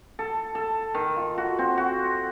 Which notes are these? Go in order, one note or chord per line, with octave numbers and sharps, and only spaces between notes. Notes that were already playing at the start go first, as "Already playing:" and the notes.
A4
A4
D#3
F4
F#4
C4
F#4